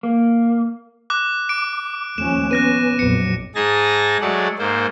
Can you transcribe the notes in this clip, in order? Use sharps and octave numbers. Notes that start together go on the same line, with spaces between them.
A#3
D6 F#6
D6 D7
D#2 F3 A3 C#4 E7
B3 C#4 B4 F#6 A#6 D#7
A#1 F2 F#3 C#7
G#2 D#4 G#4 G#5 A5 A#6
F#3 G#3 A3 D5 F#5
G#2 A#3 C5